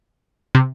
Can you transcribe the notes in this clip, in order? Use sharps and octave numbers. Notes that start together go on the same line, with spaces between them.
C3